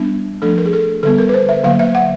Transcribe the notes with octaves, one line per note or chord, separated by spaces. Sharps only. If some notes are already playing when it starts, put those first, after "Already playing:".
Already playing: G3 B3 D4
F3 A3 D4 A4
A#4
G#4
A4
D3 G3 B3 A4
A#4
B4
C5
E5
D3 F#3 A#3 F5
E5
F#5